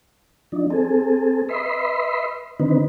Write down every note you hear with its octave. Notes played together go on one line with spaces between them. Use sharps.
F3 D4 D#4
C4 G#4 A4
B4 D#5 E5 B5 C6
D3 D#3 C4 D#4 B4